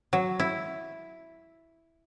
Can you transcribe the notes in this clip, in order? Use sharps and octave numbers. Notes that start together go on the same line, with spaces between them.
F#3
E4